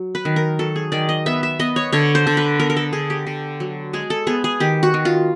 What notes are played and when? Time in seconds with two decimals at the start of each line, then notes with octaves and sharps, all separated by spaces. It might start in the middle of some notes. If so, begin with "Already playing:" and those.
Already playing: F#3
0.15 B4
0.25 D#3
0.36 A#4
0.59 F#3 A4
0.76 G#4
0.92 D#3 D5
1.09 D#5
1.26 B3 E5
1.43 E5
1.59 B3 D#5
1.76 C#5
1.92 D3 C#5
2.15 C5
2.27 D3
2.37 B4
2.60 B3 A#4
2.70 A#4
2.77 A4
2.93 D3 G#4
3.10 G4
3.27 D3
3.60 F#3
3.93 G#3 G#4
4.10 A4
4.27 B3 G#4
4.44 G#4
4.60 D#3 G4
4.83 F#4
4.94 D#3
5.05 F4